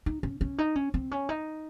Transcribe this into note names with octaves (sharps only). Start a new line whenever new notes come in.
D#4
C#4
C#4
D#4
C#4
C4
C#4
D#4